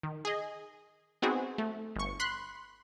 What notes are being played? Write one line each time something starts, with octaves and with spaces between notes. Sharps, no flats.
D#3
G#4 D#5
B3 C4 D#4 F#4 G#4
A3
G1 C#6
B5 C6 F#6